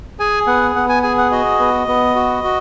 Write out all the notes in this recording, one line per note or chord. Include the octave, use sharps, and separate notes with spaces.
G#4 G#5
B3 F#5
B3 F#5
G#5
G#4 G#5
F#5
F#4 D#5
B3
B3
F#4
F#4